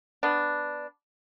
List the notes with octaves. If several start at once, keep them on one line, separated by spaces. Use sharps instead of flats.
B3 D4